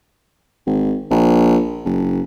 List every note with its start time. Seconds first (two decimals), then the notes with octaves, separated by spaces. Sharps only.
0.67 G#1
1.11 A#1
1.85 F#1